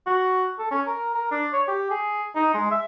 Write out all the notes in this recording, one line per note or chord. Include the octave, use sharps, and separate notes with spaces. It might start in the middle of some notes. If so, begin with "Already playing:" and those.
F#4
A4
C#4
A#4
A#4
D4
C#5
G4
G#4
D#4
G#3
E5